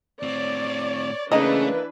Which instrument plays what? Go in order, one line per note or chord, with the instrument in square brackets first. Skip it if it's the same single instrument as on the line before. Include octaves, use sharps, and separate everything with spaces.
[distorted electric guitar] A2 C4 [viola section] C#5 D5
[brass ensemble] C#3 [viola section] E3 D4 B4 [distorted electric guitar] A3 [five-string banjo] A#3 D#4 D#5